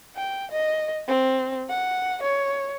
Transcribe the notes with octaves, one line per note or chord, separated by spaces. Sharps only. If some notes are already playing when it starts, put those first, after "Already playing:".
G5
D#5
C4
F#5
C#5